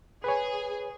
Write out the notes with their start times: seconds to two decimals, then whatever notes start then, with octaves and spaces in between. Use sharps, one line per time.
0.24 G#4 B4 C#5